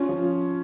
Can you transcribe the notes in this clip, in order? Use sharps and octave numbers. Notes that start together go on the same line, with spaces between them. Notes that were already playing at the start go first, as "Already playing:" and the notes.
Already playing: C#4 F4
F3